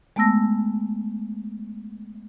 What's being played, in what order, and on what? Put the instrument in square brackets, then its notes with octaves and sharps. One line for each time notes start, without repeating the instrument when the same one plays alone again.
[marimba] G#3 A3 B3 A5 E6 A#6